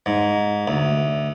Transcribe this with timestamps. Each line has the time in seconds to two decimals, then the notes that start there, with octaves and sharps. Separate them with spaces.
0.06 G#2
0.68 D2